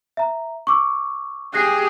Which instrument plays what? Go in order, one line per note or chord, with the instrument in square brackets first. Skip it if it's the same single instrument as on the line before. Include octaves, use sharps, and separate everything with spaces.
[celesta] E5 A#5
C#6 D6 E6
[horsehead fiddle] G4 G#4 [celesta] F#6 A#6 C7